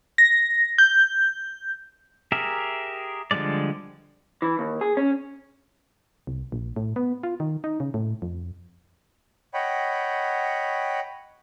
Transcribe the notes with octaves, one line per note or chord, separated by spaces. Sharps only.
A#6
G6
G4 G#4 A#4 E5
D3 F3 G3 G#3 D5
E3
D#2
G#4
C#4
C2
A#1
A2
B3
F4
D#3
D#4
C#3
A2
F2
C#5 D#5 F#5 G5 B5